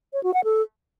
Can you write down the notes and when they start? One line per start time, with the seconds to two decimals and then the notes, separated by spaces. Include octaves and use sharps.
0.13 C#5
0.23 F#4
0.34 F#5
0.44 A4